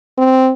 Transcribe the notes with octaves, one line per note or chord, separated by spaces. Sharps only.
C4